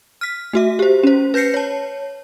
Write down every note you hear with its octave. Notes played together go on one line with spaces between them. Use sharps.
F6 B6
A3 F#4 E5
G4 C5
C#4 C5
B4 G6 A#6 C7 C#7
C#5 A5